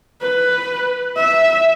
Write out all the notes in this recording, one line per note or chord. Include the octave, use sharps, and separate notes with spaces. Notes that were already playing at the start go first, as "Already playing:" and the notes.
B4
E5